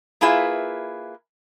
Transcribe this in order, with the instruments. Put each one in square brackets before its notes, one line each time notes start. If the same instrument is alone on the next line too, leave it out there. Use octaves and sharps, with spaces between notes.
[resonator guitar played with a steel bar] A#3 E4 F4 G#4 B4 E5